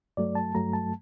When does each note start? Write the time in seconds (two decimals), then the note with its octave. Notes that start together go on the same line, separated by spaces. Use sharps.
0.17 G2 F#3 A3 D5
0.35 A5
0.55 G2 F#3 A3 A#5
0.73 A5